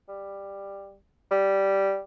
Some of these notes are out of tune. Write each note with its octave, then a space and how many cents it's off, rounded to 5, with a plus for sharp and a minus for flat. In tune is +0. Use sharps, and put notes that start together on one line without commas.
G3 +10
G3 -5